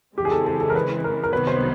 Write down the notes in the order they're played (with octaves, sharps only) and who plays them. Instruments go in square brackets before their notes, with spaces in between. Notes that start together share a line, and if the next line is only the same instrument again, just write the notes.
[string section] C#3 E3 G#3 C4 [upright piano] G4
[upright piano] G#4
A4
A4
A4
A#4
B4
A#4
A#4
[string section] C2 C3 D#3 F#3 B3 [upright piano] B4
[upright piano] C5